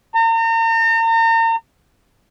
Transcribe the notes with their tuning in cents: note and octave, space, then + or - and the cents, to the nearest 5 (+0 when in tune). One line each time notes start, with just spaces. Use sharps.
A#5 -40